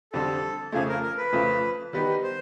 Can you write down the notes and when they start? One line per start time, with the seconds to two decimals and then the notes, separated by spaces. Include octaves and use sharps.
0.12 F2 D3 G3 C4 A4
0.72 F2 C#3 F3 A3 G#4
0.88 A#4
1.03 A#4
1.18 B4
1.33 F2 C#3 F3 A3
1.93 D#3 G3 B3 D#4 G4 B4
2.23 C5